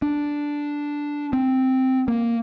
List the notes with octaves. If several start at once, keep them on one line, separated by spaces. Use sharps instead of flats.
D4
C4
A#3